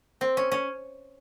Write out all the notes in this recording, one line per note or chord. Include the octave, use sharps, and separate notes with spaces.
C4
C#4
C#4